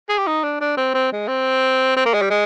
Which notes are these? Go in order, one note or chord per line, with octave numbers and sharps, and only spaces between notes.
G#4
G4
D#4
D4
D4
C4
C4
G#3
C4
C4
A#3
G#3
G3
G#3